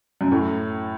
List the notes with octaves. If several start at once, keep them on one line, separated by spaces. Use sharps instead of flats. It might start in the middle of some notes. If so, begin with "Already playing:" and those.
F#2
A2